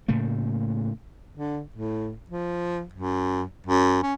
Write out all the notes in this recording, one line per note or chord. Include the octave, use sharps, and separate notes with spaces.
A2 C#3 A3 A#3
D3
A2
F3
F#2
F#2
C#4